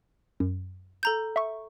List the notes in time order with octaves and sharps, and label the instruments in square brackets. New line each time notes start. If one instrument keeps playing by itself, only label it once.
[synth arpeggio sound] F#2
[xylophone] A4 A#5 G6
[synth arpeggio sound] E5 C#6